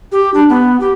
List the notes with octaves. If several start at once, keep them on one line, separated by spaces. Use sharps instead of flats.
G4
D4
B3
G4